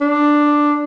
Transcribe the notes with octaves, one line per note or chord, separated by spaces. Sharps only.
D4